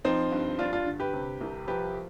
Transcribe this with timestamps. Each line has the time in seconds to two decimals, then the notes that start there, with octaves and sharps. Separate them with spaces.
0.05 F3 C4 D#4
0.32 G2
0.59 G2 D4 F4
0.73 D4 F4
0.86 D3
1.00 G4 B4
1.13 C3
1.41 C2
1.68 F3 G4 B4